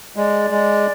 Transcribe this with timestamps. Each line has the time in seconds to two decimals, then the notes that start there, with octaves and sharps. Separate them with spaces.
0.16 G#3 D5
0.50 G#3